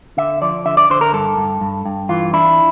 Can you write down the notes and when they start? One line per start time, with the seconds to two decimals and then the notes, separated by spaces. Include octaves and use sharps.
0.17 D3 E5
0.42 F3 D5
0.65 D3 E5
0.77 D5
0.90 D3 C5
1.01 A#4
1.13 G2 A4
1.37 G2
1.61 G2
1.86 G2
2.09 E3 F4
2.33 D4 E4